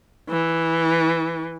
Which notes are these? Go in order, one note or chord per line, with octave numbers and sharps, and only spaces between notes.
E3